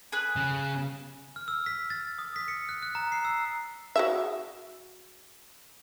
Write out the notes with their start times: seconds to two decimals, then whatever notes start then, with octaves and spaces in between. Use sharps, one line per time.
0.12 G#4 B4 F#6
0.36 C#3
1.36 F6
1.48 E6
1.66 B6
1.90 A6
2.19 D#6
2.36 B6
2.48 C#7
2.69 F#6
2.83 F#6
2.95 A#5
3.12 C7
3.25 E6
3.96 F#4 G#4 E5